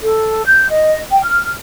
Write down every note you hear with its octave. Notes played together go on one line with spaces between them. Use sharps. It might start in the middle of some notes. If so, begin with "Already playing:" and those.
A4
G6
D#5
G5
F6